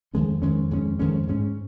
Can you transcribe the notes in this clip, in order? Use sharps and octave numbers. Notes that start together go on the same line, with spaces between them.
F2 D#3 G#3 C#4
F2 D#3 G#3 C#4
F2 D#3 G#3 C#4
F2 D#3 G#3 C#4
G#2 G#3 C#4